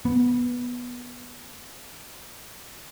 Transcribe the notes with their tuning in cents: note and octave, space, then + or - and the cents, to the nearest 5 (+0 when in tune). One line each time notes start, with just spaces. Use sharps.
B3 -10